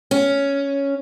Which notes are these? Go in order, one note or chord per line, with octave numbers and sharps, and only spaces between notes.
C#4